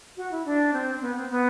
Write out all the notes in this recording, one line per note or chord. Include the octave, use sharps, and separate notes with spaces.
F#4
E4
D4
C4
C4
B3
C4
B3